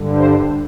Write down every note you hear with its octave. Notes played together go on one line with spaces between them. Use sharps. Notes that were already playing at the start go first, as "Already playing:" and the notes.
Already playing: G2 D3
C5